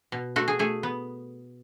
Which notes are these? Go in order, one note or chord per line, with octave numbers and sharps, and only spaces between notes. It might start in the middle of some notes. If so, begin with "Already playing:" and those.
B2
A3 F#4
G#4
A3 G#4
B3